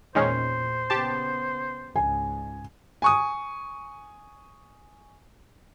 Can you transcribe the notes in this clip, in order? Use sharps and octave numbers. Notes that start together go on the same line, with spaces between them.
E2 A#2 D#3 G#3 C#4 C5
C#3 B3 G4 A5
C#2 G#2 G#5
G#5 C#6 D#6